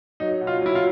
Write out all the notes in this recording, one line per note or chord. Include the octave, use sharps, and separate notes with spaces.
F#3 D#4
B2
F4
F#3 E4
F4